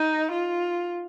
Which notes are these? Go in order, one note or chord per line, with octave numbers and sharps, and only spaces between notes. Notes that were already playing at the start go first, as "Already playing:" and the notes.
Already playing: D#4
F4